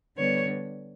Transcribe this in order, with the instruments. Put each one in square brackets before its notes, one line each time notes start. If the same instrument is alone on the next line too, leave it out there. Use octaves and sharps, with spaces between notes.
[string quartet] D3 G3 B3 C#5